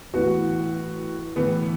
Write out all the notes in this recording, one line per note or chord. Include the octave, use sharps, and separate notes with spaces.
A2 E3 B3 F#4
A2 E3 B3